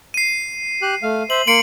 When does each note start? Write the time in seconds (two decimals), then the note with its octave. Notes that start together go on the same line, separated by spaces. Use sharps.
0.14 C7 D#7
0.82 G4 F#6
1.03 A3 F5
1.30 C5 E5 F#7
1.47 A#3 C6 C#7 D7 F#7